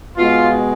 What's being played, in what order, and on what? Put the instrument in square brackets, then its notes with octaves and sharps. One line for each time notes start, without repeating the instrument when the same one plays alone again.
[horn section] B2 G#3 F4